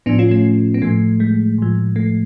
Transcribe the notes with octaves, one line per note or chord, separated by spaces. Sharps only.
A2 F3 B3 D4
C#4 F4
A3 C#4
B3
A2 F3 A3
G#3
A2 F3
A3